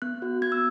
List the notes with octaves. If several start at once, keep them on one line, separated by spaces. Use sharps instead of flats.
B3 F#6
F#4
B3 G#6
E6